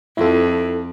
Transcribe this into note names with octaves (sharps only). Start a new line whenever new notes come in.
F2 E4 F4 A4